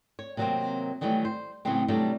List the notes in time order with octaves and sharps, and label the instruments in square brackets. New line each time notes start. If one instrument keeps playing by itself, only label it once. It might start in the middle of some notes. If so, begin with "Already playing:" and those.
[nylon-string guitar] C#5
C3 D#3 F#3 G3 A#3 C4
D#3 E3 F#3 G3 A3
C5
A2 C#3 E3 F#3 B3 C4
C3 F#3 G3 A3 B3 D4